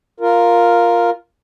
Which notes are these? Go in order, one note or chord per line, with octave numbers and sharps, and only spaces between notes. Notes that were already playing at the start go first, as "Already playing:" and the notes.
F4 A#4